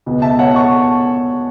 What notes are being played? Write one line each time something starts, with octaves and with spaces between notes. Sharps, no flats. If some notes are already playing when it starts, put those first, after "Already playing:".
C#2 B2 B3
E5 A5
C#5 F#5
A5 C#6